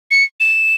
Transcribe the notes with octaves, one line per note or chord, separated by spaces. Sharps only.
C#7
E7